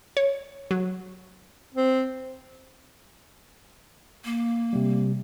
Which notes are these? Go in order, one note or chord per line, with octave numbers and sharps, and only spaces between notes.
C#5
F#3
C4
A#3
C3 G3